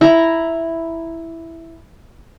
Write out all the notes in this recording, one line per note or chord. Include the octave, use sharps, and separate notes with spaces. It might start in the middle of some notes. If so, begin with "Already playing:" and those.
E4 A#5